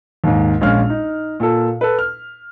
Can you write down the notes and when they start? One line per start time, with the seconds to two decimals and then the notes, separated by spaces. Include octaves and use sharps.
0.24 D#2 G#2
0.61 A#1 G#3 C#4 F5 F6
0.90 D#4
1.40 A#2 A4
1.81 A4 B4
1.99 F6